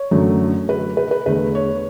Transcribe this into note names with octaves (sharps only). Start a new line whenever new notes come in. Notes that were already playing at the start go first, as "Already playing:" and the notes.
Already playing: C#5
F#2 D3 F#3 A3
B4
B4
B4
E2 D3 A3 B4
C#5